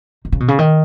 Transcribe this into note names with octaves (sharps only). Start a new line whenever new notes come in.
D#3
C#3
B2
C#3
D#3